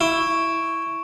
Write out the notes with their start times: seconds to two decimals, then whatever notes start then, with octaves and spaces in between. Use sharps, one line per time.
0.01 E4 C#6 D7 E7